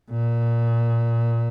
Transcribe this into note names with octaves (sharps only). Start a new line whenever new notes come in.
A#2